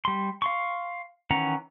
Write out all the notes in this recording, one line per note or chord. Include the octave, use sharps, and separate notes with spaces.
G3 C6
F5 C6 C#6
D#3 E3 C#4 F#5 A#5